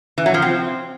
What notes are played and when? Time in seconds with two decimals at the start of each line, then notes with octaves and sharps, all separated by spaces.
0.18 E3
0.26 F#3
0.34 F3
0.42 C4